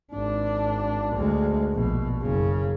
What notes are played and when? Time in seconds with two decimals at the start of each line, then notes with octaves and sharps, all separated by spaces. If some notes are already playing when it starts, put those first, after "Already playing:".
0.13 G#1 D4
1.15 D2 G#3
1.73 A#1 B2
2.21 F#1 C#3